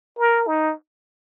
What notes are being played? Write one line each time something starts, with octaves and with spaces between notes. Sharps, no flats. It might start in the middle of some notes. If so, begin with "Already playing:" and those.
A#4
D#4